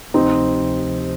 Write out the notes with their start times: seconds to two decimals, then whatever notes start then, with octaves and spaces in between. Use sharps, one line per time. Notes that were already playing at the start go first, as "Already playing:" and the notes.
0.14 D2 C3 F3 C4 D#4